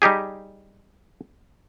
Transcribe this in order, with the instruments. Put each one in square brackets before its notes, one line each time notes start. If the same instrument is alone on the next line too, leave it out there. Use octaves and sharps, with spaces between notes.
[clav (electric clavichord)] G3 D#4 G4 G#4